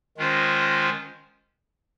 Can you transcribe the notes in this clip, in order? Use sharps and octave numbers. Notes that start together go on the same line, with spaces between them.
D#3 G#3 C#4 F4 C5